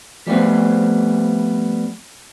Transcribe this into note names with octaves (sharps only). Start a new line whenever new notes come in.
F3 G3 A3 B3 C4